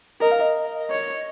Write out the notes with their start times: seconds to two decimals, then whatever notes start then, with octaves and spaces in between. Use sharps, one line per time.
0.21 A#4 D#5
0.31 F5
0.41 D#5
0.91 C#5